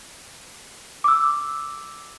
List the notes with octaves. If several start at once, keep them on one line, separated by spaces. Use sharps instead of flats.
D6 E6